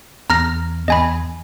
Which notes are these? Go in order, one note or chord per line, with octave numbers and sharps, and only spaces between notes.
E2 A#5 F6 A#6
E2 D#5 G#5 B5